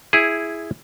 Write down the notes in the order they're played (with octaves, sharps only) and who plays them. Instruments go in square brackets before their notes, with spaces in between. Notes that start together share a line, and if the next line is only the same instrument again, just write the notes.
[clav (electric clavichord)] E4 G#4